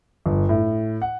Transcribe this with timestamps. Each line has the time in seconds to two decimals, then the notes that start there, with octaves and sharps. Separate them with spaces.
0.26 G1
0.49 A2
1.02 F#5